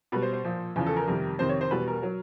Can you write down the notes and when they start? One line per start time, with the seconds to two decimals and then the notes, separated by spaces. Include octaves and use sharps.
0.12 B2 B4
0.16 G3
0.22 C5
0.33 C5
0.44 A#2 F3
0.76 E2 C#3 F3
0.86 A4
0.97 A#4
1.07 F2 C3 D#3 G3
1.39 F2 C3 D#3 C5
1.49 C#5
1.61 C5
1.71 E2 B2 G3 B4
1.88 A#4
2.03 F#3